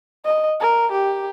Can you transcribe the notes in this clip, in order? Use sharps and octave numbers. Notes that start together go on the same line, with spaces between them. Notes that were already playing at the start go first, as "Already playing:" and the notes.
D#5
A#4
G4